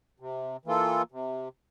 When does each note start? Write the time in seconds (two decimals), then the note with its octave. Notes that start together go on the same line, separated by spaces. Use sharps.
0.20 C3
0.65 E3 A#3 F4 A4
1.12 C3